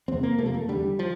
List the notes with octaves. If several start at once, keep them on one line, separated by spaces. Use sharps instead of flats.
E2 C3 C4
A#3
F2 C3 A3 A#3
A3
E2 D3 G3
F3